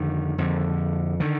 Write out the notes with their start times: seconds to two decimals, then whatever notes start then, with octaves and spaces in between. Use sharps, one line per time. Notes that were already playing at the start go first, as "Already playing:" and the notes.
Already playing: F2 D3 D#3
0.38 F2 D3
1.20 D3 D#3